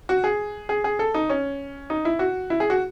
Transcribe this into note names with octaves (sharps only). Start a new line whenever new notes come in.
F#4
G#4
G#4
G#4
A4
D#4
C#4
D#4
E4
F#4
E4
G#4
F#4